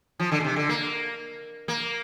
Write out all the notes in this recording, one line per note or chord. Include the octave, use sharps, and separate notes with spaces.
F3
D3
A#2
C3
D3
A#3
A#3